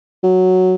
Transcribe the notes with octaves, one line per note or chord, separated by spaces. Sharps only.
F#3